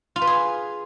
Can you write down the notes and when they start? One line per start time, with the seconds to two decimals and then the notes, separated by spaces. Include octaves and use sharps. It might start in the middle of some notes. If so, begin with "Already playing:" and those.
0.16 F4
0.22 B4
0.27 G#4